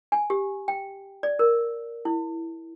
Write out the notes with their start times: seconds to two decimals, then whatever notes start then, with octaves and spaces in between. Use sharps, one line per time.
0.12 G#5
0.30 G4
0.68 G5
1.23 D5
1.39 A#4
2.05 E4